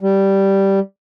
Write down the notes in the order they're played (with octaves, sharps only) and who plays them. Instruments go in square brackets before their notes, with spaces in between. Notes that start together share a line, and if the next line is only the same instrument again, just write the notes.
[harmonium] G3